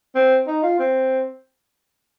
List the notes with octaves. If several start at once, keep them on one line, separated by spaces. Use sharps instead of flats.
C4
D#4
F4
C4